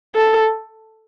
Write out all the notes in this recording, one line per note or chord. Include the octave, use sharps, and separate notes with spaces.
A4